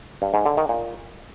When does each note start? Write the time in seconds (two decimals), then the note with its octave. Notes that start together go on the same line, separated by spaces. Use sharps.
0.22 G2
0.34 G#2
0.46 D3
0.57 D#3
0.69 A#2